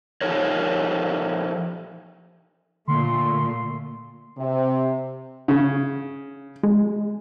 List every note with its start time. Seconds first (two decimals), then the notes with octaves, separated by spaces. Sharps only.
0.21 F3 D#4 G4 A4 A#4 C#5
2.87 A#2 D3 A3 C6
4.37 C3
5.48 C#3
6.63 G#3